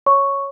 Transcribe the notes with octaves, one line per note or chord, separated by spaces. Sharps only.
C#5 C#6